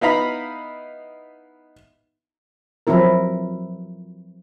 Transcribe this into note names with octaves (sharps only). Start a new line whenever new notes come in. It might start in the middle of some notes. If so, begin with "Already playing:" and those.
B3 D#4 E4 F5 A#5 B5
F3 F#3 C4 E4 A#4